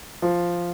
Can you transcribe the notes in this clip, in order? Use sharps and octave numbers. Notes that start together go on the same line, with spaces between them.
F3